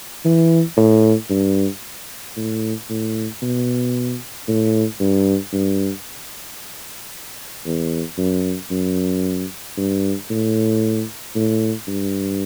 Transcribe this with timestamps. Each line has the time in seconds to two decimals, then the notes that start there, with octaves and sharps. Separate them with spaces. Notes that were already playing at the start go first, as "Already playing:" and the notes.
0.25 E3
0.77 A2
1.30 G2
2.36 A2
2.90 A2
3.42 B2
4.48 A2
5.00 G2
5.53 G2
7.66 E2
8.18 F#2
8.71 F#2
9.77 G2
10.30 A2
11.35 A2
11.88 G2